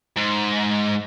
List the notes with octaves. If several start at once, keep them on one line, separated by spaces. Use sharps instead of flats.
G#2